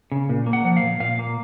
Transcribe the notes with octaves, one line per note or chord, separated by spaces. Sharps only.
C#3
A#2
A#3
F#5
F3
F5
A#2
A#2 F5
A#3